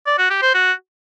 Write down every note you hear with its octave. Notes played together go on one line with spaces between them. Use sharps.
D5
F#4
G4
C5
F#4